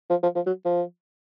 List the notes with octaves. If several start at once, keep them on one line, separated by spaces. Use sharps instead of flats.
F3
F3
F3
F#3
F3